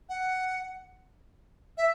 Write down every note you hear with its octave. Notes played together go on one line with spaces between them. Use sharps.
F#5
E5